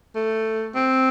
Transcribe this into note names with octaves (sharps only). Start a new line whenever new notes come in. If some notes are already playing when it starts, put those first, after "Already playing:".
A3
C4